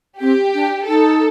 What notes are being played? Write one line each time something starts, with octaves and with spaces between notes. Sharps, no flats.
C4 G4
D4
D#4 A4